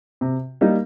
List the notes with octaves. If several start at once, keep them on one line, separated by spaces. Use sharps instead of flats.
C3
G3 A#3 D#4